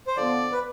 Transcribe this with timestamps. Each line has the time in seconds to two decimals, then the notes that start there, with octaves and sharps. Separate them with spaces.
0.07 C5
0.17 D3 F3 B3 D5
0.52 B4